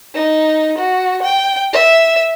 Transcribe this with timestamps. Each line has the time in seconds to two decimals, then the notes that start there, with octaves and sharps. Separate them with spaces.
0.15 D#4
0.78 F#4
1.23 G5
1.73 E5